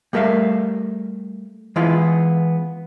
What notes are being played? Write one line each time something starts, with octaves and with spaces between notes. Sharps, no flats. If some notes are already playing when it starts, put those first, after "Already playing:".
G3 A3 A#4 E5 F5
E3 G#3 B3 E4 F4